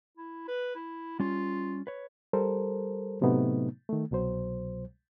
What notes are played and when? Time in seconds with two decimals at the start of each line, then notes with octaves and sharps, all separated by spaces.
0.17 E4
0.48 B4
0.75 E4
1.20 G3 C#4 F4
1.87 B4 C#5
2.33 G3 A4 A#4 C5
3.21 A2 C3 F#3 A3 B3 D#4
3.89 D#3 A3
4.11 C2 B2 F#3 C5